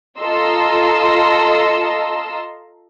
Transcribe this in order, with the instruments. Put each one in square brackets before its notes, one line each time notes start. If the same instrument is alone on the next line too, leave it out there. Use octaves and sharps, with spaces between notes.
[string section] F4 A4 D#5 A#5 C6 E6